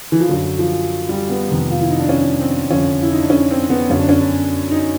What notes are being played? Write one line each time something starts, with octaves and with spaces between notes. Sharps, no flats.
E3
F3
F#2 D3 F#3
F3
G3
B3
F2 C3 D#3
F4
E4
D#4
D4
C#4
C4
F2 D3 C#4
E4
D#4
D4
C#4
C4
B3
F#2 D3 C#4
D4
C#4
D4
D#4